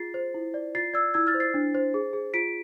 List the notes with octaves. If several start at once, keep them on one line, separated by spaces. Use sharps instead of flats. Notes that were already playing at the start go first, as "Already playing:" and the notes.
Already playing: F4 G#4 A6 C7
C5
E4
D5
F4 A6 C7
D5 E6 G#6
E4 E6 G#6
F6 A6
C5
A6 C7
D4
C5
G#4
G#4
F4 B6 D7